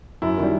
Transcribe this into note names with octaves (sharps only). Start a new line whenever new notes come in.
F#2 E4
D#3 G3